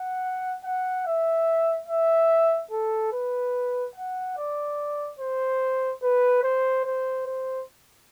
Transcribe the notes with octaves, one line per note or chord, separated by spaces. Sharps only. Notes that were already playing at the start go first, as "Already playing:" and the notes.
Already playing: F#5
F#5
E5
E5
A4
B4
F#5
D5
C5
B4
C5
C5
C5